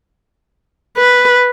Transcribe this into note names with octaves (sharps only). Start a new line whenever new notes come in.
B4